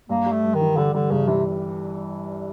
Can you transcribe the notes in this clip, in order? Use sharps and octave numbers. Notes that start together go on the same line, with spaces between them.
G2 A#3
G3
A3
G2
D#3
E3
D3 G3
D3 G3
G1 C#3
C3 E3